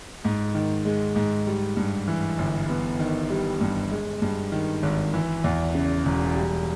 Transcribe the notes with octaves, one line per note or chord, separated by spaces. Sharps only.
G#2
D#3
G#3
G#2
G3
G2
E3
G1
B3
D#3
G3
G2
G#3
G2
D#3
G#1
E3
E2
C#3
E1
G3